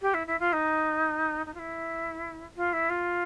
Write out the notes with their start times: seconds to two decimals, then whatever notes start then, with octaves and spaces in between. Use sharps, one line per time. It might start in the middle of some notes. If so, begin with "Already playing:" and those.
0.01 G4
0.14 E4
0.27 E4
0.40 F4
0.53 D#4
1.46 D#4
1.54 F4
1.59 E4
2.56 F4
2.73 E4
2.89 F4